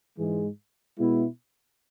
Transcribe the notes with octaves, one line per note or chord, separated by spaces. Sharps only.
G#2 E3 G#3
B2 G#3 B3 E4